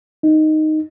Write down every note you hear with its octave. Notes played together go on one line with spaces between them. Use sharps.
D#4